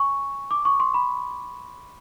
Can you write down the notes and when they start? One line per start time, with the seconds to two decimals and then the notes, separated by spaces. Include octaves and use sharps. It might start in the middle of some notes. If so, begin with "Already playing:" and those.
Already playing: G#5 C#6
0.51 D6
0.65 C#6
0.80 C6
0.94 B5